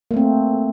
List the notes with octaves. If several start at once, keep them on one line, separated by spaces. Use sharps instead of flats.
A3 A#3 C4